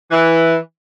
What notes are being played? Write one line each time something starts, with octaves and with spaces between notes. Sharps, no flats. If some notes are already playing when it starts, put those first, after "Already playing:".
E3